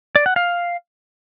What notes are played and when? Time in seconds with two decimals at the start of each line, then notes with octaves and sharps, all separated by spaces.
0.16 D5
0.26 F#5
0.36 F5